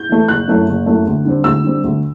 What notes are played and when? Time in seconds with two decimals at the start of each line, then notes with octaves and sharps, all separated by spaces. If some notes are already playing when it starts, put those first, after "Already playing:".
Already playing: G6
0.09 E3 A3
0.28 F#1 F#6
0.47 F#2 F#3 A3 E4
0.67 F#1
0.86 F#2 F#3 A3 E4
1.06 D2
1.25 D3 G3 C4
1.44 D2 E6
1.64 D3 G3 C4
1.84 D2